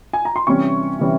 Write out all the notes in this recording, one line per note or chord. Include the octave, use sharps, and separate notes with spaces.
G#5
A#5
C6
C3 E3 G3 C#4 C#6
C3 E3 G3 C#4